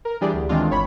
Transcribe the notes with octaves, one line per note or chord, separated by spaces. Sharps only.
A#4
E3 G3 D4 G4 G#4 D5
D2
D#3 E3 G#3 C4 D4 F4
G1 C#5 B5